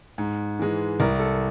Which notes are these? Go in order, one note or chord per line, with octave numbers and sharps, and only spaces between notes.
G#2
E3 G#3
C2 A#4
A4